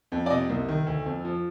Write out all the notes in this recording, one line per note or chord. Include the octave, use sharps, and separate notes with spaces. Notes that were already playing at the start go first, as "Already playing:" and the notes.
F2
D5
C3 D#5
C2
D#3
D2
F2
F3